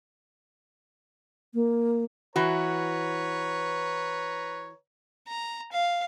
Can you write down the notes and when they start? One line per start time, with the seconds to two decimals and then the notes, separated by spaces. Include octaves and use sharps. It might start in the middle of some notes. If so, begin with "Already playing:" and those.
1.54 A#3
2.36 E3 F#4 B4 C#5 A#5
5.27 A#5
5.72 F5